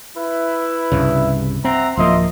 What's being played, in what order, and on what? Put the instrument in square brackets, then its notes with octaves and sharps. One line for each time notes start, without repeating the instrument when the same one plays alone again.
[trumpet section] E4 B4 E5
[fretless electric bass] C2 G2 C#3
[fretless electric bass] C4 [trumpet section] E5 F#5 A#5
[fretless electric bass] D1 F3 A#3 [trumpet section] D#5 E5 C6